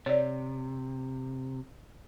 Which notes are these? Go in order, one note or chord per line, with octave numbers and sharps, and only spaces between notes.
C3 C#5 D5